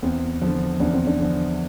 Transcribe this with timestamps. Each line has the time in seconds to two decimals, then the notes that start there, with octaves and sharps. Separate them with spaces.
0.02 E2 C4
0.42 D3 F3
0.80 E2 D4
0.93 C4
1.07 D4
1.19 D3 F3